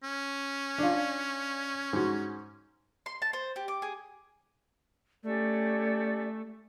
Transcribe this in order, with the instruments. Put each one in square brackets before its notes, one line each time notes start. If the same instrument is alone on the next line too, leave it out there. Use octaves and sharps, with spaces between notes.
[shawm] C#4
[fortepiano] D4 F4
G#2 F#4
[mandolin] C6
A5
C5
G4
D6
G#4
[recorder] A3 [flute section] C#4 G4 D5